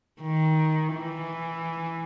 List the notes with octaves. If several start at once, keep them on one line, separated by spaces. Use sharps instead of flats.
D#3
E3